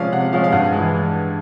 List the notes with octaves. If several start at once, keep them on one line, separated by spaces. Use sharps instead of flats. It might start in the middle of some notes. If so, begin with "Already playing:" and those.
Already playing: C3 F3 G#3 C#4 D5 F5
C3 F#5
F3 G#3 C#4 F5
F5
G2 F#5
E3 G#3